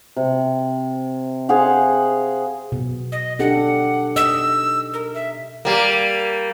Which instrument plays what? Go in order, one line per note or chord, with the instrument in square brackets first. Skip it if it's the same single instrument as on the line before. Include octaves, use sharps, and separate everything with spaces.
[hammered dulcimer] C3
G#4 C5 F5 F#5
[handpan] B2
[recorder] D#5
[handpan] D4 G4 A4 [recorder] F#5
[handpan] D#5 [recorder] E6
[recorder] A#4
E5
[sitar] G3 A#3